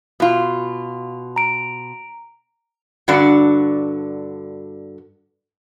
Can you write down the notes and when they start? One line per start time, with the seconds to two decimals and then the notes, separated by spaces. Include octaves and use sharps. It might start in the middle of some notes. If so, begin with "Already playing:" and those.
0.20 B2 F4
1.36 A#5 D7
3.08 G2 D3 F#4 D5